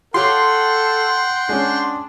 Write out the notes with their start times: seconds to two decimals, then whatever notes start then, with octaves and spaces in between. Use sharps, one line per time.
0.14 F4 G4 A4 C#5 F#5 G5 C6
1.49 G#3 C#4 D4